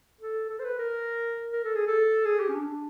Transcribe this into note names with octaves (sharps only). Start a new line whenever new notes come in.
A4
A4
C5
B4
A#4
A#4
A4
G#4
A4
G#4
G4
C#4
D4